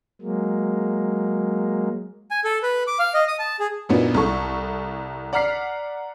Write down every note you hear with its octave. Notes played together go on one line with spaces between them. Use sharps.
F#3 G#3 A#3
G#5
A4
B4
D6
F5
D#5
D#6
A5
G#4
F#2 A#2 F#3 B3 D4 D#4
C2 E4 A4 C#6
D5 F#5 A#5 F6 B6 C7